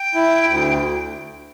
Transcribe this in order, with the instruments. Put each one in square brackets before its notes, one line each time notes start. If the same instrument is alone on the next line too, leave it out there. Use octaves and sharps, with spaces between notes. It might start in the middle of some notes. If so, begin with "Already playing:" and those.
Already playing: [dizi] G5
[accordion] E4
D2